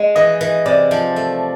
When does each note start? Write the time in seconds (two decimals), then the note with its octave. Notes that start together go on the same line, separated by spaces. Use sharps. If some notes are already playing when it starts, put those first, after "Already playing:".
Already playing: G#3
0.15 E3 D#5
0.41 E3
0.66 C3 D5
0.91 F3
1.16 A3